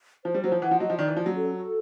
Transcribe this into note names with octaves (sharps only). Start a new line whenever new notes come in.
F3 C5
G3
F#3 C5
F3
E3 F#5
F3
F#3 D#5
F3
D#3 D5
E3
F3 C#4
F#3
A4
F#4